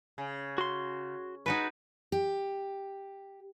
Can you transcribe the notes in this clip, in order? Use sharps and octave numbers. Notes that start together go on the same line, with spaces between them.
C#3
F#4 C6
G#3 D#4 F#4 B4
G4